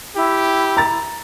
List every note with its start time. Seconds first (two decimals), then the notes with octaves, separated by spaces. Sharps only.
0.16 E4 G4
0.77 A#5 A6